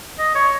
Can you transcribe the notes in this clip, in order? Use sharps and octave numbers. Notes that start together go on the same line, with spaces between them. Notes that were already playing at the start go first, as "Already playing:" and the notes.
D#5
C#5